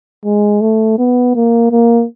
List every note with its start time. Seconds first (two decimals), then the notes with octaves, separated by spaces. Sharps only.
0.25 G#3
0.61 A3
0.98 B3
1.35 A#3
1.71 A#3